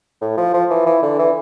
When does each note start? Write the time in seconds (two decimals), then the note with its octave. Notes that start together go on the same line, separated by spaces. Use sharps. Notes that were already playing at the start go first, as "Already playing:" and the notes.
0.21 A2
0.37 F3
0.54 F3
0.70 E3
0.86 E3
1.02 D3
1.19 E3